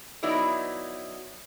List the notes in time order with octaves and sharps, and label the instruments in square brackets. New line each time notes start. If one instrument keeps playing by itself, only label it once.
[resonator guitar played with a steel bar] F#3 B3 D#4 E4 D5